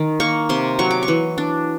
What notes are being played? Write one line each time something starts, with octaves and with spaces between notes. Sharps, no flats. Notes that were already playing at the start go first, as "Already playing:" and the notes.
Already playing: D#3
A#3 C#6
C3 C6
F#3 C#6
D6
C#6
E3
D4